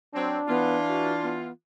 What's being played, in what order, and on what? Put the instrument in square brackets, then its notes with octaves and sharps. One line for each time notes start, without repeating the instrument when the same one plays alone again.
[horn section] F#3 C4 [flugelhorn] D4
[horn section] E3 F4 [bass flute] B3
[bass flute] F#4
B3